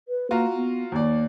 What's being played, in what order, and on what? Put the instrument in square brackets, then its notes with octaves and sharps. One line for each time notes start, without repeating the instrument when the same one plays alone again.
[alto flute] B4
[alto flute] A#3 [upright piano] F4 F#4 A#5
[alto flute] B3
[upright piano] D#2 D5 [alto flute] A#3